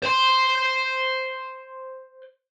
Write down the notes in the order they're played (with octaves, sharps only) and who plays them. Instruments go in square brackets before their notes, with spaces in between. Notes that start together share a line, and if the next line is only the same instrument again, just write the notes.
[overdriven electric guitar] C5 C6